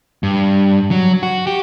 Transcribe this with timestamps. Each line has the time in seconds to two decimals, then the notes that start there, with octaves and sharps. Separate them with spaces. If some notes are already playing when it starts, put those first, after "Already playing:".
0.23 G2
0.91 F#3
1.23 F#4
1.47 G4